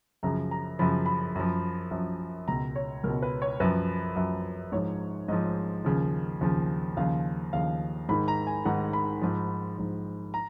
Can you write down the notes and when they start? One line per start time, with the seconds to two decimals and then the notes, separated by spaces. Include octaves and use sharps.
0.23 F#2 C#3 F3 A#5
0.51 A#5
0.79 F#2 C#3 F3 B5
1.06 B5
1.35 F#2 F3
1.91 F#2 F3
2.48 C#2 B2 A#5
2.76 C#5
3.04 C#2 B2 A#4
3.22 B4
3.42 C#5
3.60 F#2 F3 B4
4.16 F#2 F3
4.72 G#2 F3 C#5
5.28 G#2 F3 D#5
5.84 D#2 C#3 F3
6.41 D#2 C#3 F3
6.97 D#2 C#3 F3 F5
7.53 D#2 C#3 F3 F5
8.09 G#2 D#3 B5
8.28 A#5
8.47 G#5
8.65 G#2 D#3 F#5
8.93 B5
9.22 G#2 F3
9.78 G#2 F3
10.34 A#5